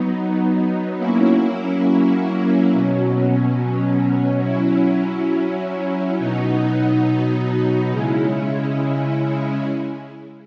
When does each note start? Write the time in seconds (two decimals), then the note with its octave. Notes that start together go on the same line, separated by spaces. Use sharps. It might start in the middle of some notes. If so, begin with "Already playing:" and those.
Already playing: F#3 B3 D#4
0.98 F#3 A#3 C#4 E4
2.72 B2 F#3 C#4
4.44 F#3 C#4 E4
6.18 B2 F#3 B3 D#4
7.91 C#3 G#3 C#4 E4